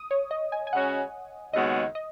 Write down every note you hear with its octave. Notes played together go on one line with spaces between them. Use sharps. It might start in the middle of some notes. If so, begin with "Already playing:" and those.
Already playing: D#6
C#5
D#5
G#5
G#5
C#3 G#3 C#4 F#4 F#5
D#2 C#3 G#3 B3 F#4 D#5
D#5